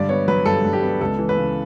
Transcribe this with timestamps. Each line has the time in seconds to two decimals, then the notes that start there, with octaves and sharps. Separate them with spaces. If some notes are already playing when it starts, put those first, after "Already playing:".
Already playing: G2 D3 D5
0.09 B3 C#5
0.28 F#3 B4
0.46 G2 A4
0.64 G2
0.73 G4
0.83 B3
1.01 C#2 A4
1.19 E3
1.29 B4
1.37 C#3